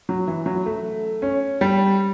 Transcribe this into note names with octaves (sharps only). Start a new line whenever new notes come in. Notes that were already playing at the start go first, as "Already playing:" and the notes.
F#3
E3
F#3
A3
C#4
G3